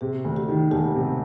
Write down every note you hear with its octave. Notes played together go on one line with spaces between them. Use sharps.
C3 G#4
D2
G4
D#3
E1 G4
C3